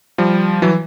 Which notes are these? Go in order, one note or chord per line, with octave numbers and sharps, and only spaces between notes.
F3 G3
E3 F#3